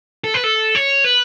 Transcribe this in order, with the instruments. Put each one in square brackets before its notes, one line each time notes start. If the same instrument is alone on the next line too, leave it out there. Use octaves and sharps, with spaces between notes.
[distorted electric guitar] A4
B4
A4
C#5
B4